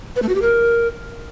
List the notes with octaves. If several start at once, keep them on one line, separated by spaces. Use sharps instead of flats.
B4
A3
F#4
G4
A#4